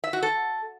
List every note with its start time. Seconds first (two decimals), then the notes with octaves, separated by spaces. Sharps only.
0.04 E5
0.13 F#4
0.23 A4